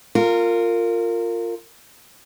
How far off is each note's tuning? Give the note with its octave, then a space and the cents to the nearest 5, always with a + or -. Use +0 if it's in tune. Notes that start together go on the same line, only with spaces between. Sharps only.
F4 +0 A#4 -25